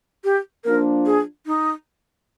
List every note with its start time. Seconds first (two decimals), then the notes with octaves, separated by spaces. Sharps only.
0.24 G4
0.64 F3 A#3 D4 F4 A#4
1.06 G#4
1.46 D#4